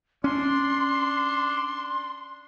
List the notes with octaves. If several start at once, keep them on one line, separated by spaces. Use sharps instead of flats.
C#4 D4 C6